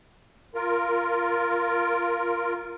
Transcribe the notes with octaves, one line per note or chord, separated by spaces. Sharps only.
F4 A#4